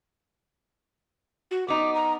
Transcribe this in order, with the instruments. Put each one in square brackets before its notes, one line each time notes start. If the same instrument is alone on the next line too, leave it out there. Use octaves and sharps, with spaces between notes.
[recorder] F#4
[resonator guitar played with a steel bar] B3 D#4 [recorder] D6
[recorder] A#5